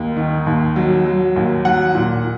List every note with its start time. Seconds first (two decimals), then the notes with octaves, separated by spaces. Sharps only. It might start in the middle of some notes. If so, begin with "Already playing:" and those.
Already playing: D#2
0.16 D#3
0.47 D#2
0.76 F#3
1.06 F#3
1.36 D#2
1.65 F#3 F#5
1.95 A#2